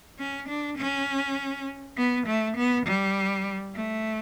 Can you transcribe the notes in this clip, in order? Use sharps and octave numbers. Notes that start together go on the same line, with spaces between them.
C#4
D4
C#4
B3
A3
B3
G3
A3